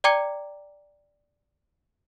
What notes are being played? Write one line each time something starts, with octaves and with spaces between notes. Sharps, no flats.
D5 G5 A#5 D6 G#6 C#7